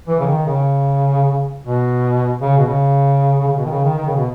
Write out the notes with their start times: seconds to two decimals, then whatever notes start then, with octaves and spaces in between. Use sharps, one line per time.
0.08 E3
0.20 C#3
0.27 D#3
0.46 C#3
1.63 B2
2.42 C#3
2.58 B2
2.67 C#3
3.47 C#3
3.58 B2
3.65 D#3
3.71 C#3
3.84 D#3
3.98 D#3
4.07 C#3
4.16 B2